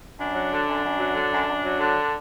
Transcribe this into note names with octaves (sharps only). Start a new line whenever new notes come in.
F#2 D4
F#3
D3
F#2
F#2
F#3
D3
F#2
F#2
F#3
D3